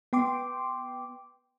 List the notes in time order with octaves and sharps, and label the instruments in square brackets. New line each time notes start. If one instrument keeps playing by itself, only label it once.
[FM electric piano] B3 G5 C6 D6